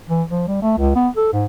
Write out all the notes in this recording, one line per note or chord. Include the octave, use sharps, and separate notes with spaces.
E3
F3
G3
A3
C#2
B3
A4
G#2